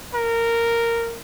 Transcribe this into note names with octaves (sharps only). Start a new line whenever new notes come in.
A#4